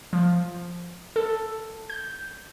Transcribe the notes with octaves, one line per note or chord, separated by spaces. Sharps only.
F3
A4
G6